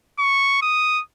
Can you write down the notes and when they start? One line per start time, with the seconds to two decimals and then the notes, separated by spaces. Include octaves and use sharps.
0.19 C#6
0.62 D#6